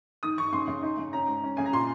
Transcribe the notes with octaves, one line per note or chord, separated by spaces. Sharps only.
D#3 D#6
D#3 C#6
C#3 C6
C#3
D#4
C#3
C#4 A#5
G#2
C#4
C#3 G#5
A#5
A#2 C6